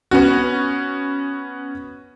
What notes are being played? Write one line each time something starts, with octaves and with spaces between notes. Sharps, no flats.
B3 C#4 F#4